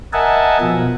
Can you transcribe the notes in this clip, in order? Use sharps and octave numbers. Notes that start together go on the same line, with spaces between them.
A#4 D#5 E5 F#5 G#5 A5
B2 F3